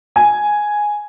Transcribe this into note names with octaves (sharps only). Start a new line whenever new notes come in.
G#5